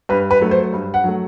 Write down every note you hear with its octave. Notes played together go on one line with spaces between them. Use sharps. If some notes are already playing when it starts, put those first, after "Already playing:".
G2 B4
B4
F#3 A3
C5
G2
F#5
F#3 A3